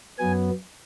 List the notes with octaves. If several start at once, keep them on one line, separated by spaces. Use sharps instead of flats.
F#2 F#3 B3 G#5